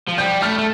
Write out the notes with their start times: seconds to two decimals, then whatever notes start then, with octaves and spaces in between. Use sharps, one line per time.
0.09 F3
0.18 G3 G6
0.41 A3 F6
0.59 A3